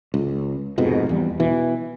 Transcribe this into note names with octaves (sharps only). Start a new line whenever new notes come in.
C#2
F1 F2 G#2 B2
E2 G3
B2 E3